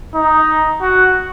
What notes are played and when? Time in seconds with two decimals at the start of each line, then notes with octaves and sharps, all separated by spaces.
0.14 D#4
0.81 F#4